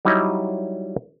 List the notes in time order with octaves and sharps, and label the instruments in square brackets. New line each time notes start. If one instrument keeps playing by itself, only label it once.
[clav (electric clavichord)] F#3 G3 D#4 E4 C#5 D#5